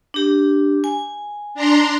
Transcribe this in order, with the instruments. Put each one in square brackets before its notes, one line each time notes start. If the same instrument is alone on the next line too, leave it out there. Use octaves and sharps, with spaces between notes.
[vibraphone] D4 G4
G#5
[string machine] D4 A#5 C6